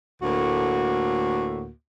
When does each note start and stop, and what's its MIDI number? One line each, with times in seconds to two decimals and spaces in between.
0.23 1.69 38
0.23 1.69 45
0.23 1.69 58
0.23 1.69 66